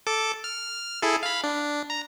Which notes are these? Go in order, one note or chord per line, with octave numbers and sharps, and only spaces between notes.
A4 D6
F6
E4 G#4 A4
F5 B5
D4
A#5